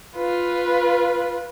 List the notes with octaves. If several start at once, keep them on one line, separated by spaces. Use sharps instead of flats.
F4 B4